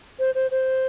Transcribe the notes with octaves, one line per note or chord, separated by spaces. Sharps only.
C5
C5
C5